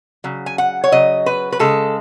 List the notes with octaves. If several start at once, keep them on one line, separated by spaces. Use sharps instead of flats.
C#3 F#3
G#5
F#5
C#5
C#3 F#3 D#5
B4
B4
C#3 G#3 A4